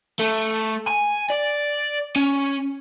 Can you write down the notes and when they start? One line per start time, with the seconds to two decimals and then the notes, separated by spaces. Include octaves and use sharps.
0.19 A3
0.87 G#5
1.30 D5
2.16 C#4